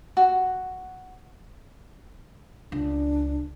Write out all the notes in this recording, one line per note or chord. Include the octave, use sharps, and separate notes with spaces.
F#4
C#2 D4